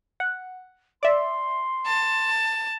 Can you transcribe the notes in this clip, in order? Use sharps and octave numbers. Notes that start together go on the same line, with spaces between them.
F#5
D5 E5 C6
A5